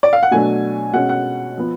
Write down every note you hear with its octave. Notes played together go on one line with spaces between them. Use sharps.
D5
F5
F#5
B2 F#3 A3 D4 G#5
B2 G#3 C#4 F#5
F#5
F3 B3